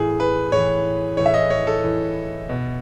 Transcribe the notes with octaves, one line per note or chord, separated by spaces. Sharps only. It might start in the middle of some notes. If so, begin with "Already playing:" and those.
Already playing: A2 E3 G#4
B4
A2 E3 C#5
A2 E3 C#5
E5
D#5
C#5
A4
A2 E3
B2